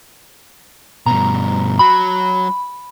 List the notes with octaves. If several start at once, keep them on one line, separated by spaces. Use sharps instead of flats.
G2 B2 A#5
F#3 B5